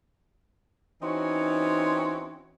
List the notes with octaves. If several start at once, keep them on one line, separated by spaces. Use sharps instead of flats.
E3 C4 C#4 D#4 F#4